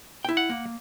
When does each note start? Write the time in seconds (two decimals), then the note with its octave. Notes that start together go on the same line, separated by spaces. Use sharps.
0.25 E4 G5
0.37 F#5
0.49 A#3